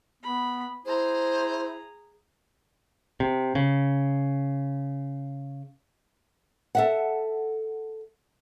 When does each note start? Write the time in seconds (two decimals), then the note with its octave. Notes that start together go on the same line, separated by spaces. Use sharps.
0.23 B3 B5
0.85 E4 G#4 C5 A#5
3.20 C3
3.55 C#3
6.75 A4 E5 F#5